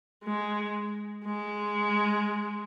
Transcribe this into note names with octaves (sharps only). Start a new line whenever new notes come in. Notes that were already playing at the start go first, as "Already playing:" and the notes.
G#3
G#3